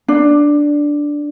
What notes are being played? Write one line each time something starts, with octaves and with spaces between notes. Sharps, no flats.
D4